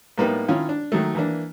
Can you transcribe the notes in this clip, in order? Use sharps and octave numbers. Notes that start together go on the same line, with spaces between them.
A2 G3 A#3 B3 D#4
D#3 C#4 E4 F4
D4
D#3 F#3 A3
E3 A#3 D4